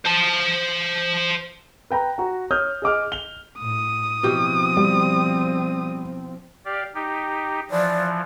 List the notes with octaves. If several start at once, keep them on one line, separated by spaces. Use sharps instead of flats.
C5 A5
B4 G5 A#5 B5
F#4 A#5
C#5 D#6 F6 G6
G#4 D#5 D6 F6
F7 G7
A2 D#6
B2 E3 F3 C4 G4
G3
G4 D5 F5
D#4 G4
E3 F3 D5